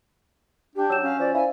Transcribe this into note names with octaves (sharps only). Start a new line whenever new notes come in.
D4 G4
F#3 E6 G6 E7
C#4 F5
F3 D5
E4 C5 D5 F5 G#5